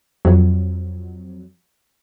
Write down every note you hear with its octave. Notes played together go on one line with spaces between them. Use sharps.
F2 F#3